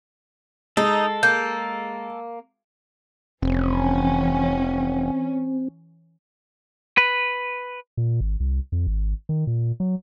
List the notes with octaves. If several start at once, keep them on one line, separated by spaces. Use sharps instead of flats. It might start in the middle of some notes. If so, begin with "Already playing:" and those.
G#3 D#4 A4
A#3 G6
F1 E3 C4 C#4
B4
A#2
G#1
C2
F2
G#1
D#3
A#2
F#3